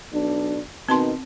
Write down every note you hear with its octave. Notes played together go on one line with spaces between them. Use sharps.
B1 D4
B2 D#3 C4 D#4 A5 C6